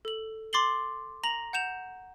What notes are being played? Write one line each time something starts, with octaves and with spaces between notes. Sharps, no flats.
A4 F#7
C6 D6 A6 C7 F#7 G7
A#5 A#6 F7 F#7
F#5 G6 E7 F7